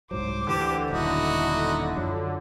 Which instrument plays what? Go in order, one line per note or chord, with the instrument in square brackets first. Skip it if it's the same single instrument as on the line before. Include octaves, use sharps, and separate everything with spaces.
[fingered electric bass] C2 G#2 F#3 [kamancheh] C5 D6
[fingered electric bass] D2 E3 [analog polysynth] D3 [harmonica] G4
[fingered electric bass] D#1 B1 [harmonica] D#4 F#4 [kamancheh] E4
[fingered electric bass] F#2 F3 F#3